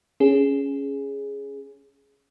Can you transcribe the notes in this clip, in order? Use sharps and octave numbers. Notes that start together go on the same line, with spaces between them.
C#4 G#4